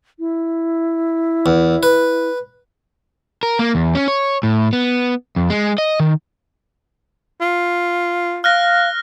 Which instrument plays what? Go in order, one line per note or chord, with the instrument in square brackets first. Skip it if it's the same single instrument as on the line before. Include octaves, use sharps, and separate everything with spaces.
[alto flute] E4
[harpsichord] E2
B4
[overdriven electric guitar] A#4
A#3
E2
C#4
C#5
A2
B3
F2
G#3
D#5
D#3
[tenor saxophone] F4
[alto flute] F5 [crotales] F6 F#6 A#6